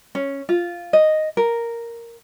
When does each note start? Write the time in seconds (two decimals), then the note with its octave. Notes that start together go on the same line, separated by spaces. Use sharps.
0.15 C#4
0.49 F4
0.93 D#5
1.37 A#4